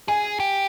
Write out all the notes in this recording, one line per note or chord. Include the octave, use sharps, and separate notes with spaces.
G#4 G#5
G4